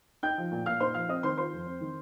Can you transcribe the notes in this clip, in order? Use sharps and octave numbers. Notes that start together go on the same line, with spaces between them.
D#4 G5 G6
F3
A#2
A#2 F5 F6
D#4 C5 C6
F3 F5 F6
C4 D#5 D#6
D#3 C5 C6
F4 C5 C6
F2
C4
D#3